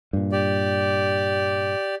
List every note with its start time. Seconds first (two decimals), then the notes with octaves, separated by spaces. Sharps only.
0.13 G2 A#2
0.32 G4 D5